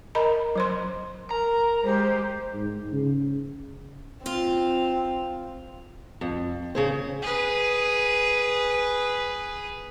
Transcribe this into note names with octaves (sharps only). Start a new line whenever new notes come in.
A#4 D#5 A#5 B5
F#3 C5 C6
A#4 A#5
G#3 G4 C5
G#2
C#3
C4 F4
F2
C#3 G#4 C5
G#4 B4